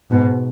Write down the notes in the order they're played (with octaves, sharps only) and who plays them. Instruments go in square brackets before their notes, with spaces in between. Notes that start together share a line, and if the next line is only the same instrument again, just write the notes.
[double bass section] G#2 B2